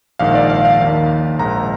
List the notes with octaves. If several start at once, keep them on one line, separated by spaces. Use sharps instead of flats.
A#1 G#2 D#3 F5
D5
F5
F5
D#2 D#3
A#1 G#2 D#3 A#5